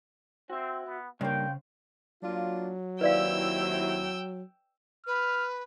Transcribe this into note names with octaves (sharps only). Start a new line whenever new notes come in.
C4 F#4 E5
B3
G2 C#3 A#3 C#4 C5 F5 G5
F#3 A#3 D4 F4
D#2 C4 E4 B4 D5 F5 G5 E6
B4 F6